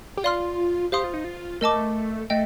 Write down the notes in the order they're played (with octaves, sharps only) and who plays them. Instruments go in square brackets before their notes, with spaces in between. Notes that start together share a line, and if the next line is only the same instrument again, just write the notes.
[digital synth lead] G4
[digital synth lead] F4 [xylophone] D5 F5 C6 F6
[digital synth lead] G4 [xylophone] C5 F5 C6 D#6
[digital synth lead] F4
D#4
F4
[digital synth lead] A3 [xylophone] A#4 D#5 A5 D6
[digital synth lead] A3 [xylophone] D#5 G5